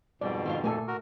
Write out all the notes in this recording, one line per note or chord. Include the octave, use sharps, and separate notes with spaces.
F2 G#2 B2 G3 D5
D#3 D4 F4
A#2 A3 A4 G#5
F#4 A#4